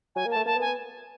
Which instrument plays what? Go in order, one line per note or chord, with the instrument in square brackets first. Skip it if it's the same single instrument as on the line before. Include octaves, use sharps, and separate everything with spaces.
[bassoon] F#3 [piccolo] G#5
[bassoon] A#3
[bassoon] A3 [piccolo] A5
[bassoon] A#3 [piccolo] A5
[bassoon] B3
[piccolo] G#5
[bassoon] B3